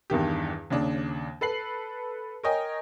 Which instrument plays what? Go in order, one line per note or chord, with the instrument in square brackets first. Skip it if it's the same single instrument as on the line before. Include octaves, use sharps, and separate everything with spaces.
[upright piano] E2 G2 D#3 G4
D#2 C#3 D4
A4 B4 C7 F#7
A#4 C#5 D#5 G5 G#5